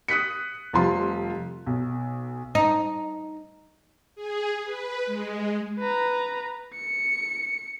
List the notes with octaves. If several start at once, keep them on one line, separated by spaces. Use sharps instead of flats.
D#6 F#6 B6 C#7
F1 F3 G3 F4 C6
B1
D#4
G#4
B4
G#3
B4 A#5
C#7